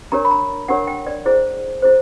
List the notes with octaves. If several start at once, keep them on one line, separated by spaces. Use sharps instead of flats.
D4 G4 A#4 C#5 A#5
B5
A#5
D4 G4 A#4 C#5 F#5
G5
D5
E4 G#4 C5
E4 G#4 C5